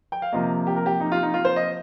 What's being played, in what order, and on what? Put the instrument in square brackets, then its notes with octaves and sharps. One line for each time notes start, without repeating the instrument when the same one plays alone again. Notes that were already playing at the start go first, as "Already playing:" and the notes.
[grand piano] G5
F5
C3 F3 A#3 D#5
G4
A#4
G4
D#4
F4
D#4
F4
C5
D#5